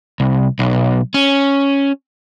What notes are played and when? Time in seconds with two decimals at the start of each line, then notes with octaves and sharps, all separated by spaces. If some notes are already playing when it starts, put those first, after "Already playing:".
0.20 C2
0.59 B1
1.14 C#4